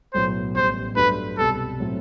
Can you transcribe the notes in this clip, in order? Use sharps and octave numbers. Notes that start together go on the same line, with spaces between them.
B1 A2 F#3 B3 C5
A1 A2 G3 B3 C5
G2 F#3 A3 D4 B4
C2 B2 G3 A4
A2 F#3 A3 C4